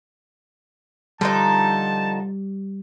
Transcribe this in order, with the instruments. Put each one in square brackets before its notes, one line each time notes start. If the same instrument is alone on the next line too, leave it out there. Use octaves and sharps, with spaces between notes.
[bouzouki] D3 F3 D#4 [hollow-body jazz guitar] G3 [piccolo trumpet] A5